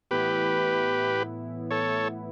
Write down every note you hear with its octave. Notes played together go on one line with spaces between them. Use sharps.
A2 E3 B3 E4 G4 B4
A4 C#5